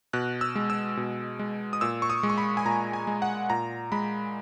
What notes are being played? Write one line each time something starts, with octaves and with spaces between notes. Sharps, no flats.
B2 F#6
E6
G#3
E6
B2
G#3
D#6
A#2 E6
C#6
D#6
G#3
C#6
B5
G#5
A#2 A#5
G#5
G#3
F#5
A#2 A#5
G#3 B5